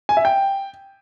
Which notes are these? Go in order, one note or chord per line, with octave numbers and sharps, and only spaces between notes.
G#5
E5
G5